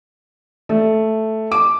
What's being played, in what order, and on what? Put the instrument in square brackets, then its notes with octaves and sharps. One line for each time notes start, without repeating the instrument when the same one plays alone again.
[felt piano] A3
D6